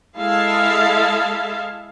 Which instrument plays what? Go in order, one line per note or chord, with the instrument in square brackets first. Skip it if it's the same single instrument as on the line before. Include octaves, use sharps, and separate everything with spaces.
[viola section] G#3 E4 A4 E5 F5 A5